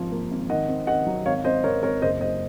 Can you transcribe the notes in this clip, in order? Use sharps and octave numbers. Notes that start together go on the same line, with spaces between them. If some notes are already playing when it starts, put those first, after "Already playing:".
Already playing: G#1 F3
A#3
G#1
D#3 D#5 F#5
C4
D#3 D#5 F#5
F#3
G#1 C#5 F5
G#1 C5 D#5
G#1 A#4 C#5
G#1 A#4 C#5
F#1 C5 D#5
F#1 C5 D#5